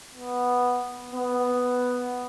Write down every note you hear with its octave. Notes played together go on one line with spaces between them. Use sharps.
B3
B3